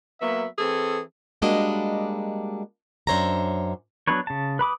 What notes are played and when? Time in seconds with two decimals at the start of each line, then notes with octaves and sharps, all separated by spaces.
0.21 F#3 A#3 B3 E5
0.58 E3 C4 G#4 A4
1.42 G3 G#3 A#3 D4 F#4 D#5
3.07 F#2 D4 C5 C#5 E5 A#5
4.07 F#3 B3 D4 B4 C#5
4.27 C#3 A5
4.59 B4 B5 D6 D#6